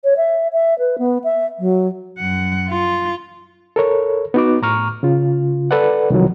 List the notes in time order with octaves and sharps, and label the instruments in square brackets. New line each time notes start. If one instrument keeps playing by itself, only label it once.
[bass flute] C#5
E5
E5
B4
B3
E5
F#3
[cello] F#2 F#5
F4
[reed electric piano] A4 A#4 C#5
B3 D#4 F#4 D6
A2 A#5 C#6 F6
C#3 F4
A4 B4 D5 F#5
C2 D#3 F3 F#3